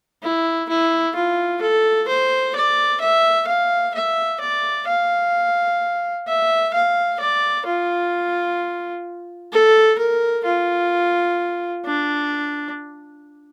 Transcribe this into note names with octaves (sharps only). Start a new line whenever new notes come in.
E4
E4
F4
A4
C5
D5
E5
F5
E5
D5
F5
E5
F5
D5
F4
A4
A#4
F4
D4